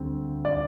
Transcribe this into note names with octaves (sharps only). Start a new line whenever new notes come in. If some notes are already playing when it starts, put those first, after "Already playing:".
Already playing: D2 G3 C4
D5